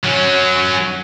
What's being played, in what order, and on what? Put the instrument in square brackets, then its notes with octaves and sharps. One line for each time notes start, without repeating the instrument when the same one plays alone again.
[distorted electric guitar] F#3 C#4